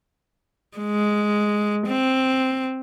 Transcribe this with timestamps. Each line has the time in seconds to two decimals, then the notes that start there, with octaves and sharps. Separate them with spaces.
0.78 G#3
1.87 C4